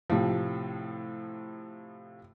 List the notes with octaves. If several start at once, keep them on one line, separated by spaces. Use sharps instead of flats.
A2 C3 F3